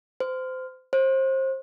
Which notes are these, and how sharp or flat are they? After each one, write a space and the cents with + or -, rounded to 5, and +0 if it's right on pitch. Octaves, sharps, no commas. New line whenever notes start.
C5 -25
C5 +25